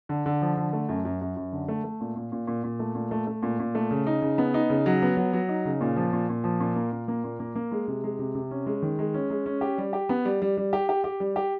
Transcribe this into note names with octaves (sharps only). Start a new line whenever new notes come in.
D3
D3
F3
D3
A3
F#2
F#2
F#2
F#2
D3
A3
A3
A#2
A#2
A#2
A#2
A#2
A3
A#2
A3
A3
A#2
A#2
A3
C#3
D#4
C#3
B3
D#4
C#3
F#3
B3
F#3
F#3
D#4
C#3
A#2
F3
A#2
A#2
F3
A#2
A#3
A#2
A#3
A#2
A#3
A#3
G#3
C3
G#3
C3
C3
C#4
G#3
D#3
G#3
C#4
G#3
C#4
G4
G3
G4
B3
G3
G3
G3
G4
G4
G4
G3
G4